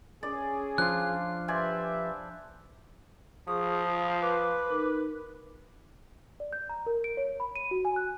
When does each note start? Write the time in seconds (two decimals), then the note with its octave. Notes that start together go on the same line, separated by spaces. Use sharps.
0.23 C#4 G#4 D5
0.78 F3 D4 F4 F#6
1.48 G4 B4 C5 D5 E5 G#5
3.48 F3 G#4 C#6 D#6
3.85 F4
4.22 B4 D6
4.69 D#4 A#4
6.40 D5
6.53 G6
6.69 A#5
6.86 A#4
7.04 D7
7.17 C#5
7.40 B5
7.56 D#7
7.71 F#4
7.85 G#5
7.96 F#6